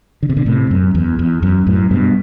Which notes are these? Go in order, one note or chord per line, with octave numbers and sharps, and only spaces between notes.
D3
C3
B2 D3
A2 C3
F#2
E2
E2
F#2
F#2 A2
G2 B2